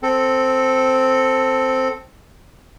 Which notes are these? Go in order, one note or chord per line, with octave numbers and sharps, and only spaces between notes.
C4 A4